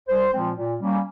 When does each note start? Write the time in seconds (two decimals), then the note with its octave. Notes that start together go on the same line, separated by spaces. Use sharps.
0.08 C2 C5
0.33 A#2 F3 G#3 C4
0.57 A#2
0.81 G3 A#3 C#4